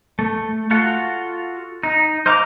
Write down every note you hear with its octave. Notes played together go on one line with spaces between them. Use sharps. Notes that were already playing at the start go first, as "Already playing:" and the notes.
A3
F4 F#4 A4 F5 F#5
D#4
C5 D#5 F5 A#5 D6